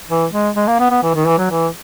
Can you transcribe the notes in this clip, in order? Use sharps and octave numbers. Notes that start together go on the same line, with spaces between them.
E3
G#3
G#3
A#3
B3
B3
E3
D#3
E3
F#3
E3